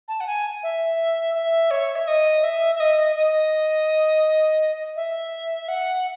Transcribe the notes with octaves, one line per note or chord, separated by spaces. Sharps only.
A5
F#5
G#5
E5
E5
C#5
E5
D#5
E5
E5
D#5
D#5
E5
F#5